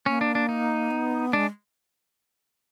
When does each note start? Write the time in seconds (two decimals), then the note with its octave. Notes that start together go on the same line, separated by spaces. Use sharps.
0.06 A#3 C#4
0.21 D4
0.35 D4
0.49 D#4
0.91 B3
1.33 G#3 D4